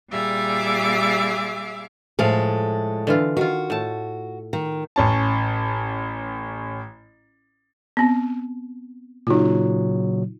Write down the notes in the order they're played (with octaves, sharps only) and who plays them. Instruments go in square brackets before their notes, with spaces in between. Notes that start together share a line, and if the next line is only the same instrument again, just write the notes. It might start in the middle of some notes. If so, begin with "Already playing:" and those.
[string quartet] A#2 G3 G#4 E5 F5 D6
[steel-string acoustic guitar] A2 G#3 A4 [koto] F3 F5
[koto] D3 E3 F4
[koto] D#3 F4 [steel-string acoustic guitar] F#4
[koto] A2 A5
[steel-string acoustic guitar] D#3
[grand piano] A1 C#4 A5
[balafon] B3 C4
[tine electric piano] A#2 C#3 F#3 [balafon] D#4 F4